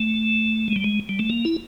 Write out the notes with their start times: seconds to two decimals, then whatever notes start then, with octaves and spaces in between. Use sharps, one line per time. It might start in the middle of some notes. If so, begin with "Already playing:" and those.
Already playing: A3
0.68 G#3
0.76 G3
0.84 G#3
1.09 G3
1.19 A3
1.30 A#3
1.45 E4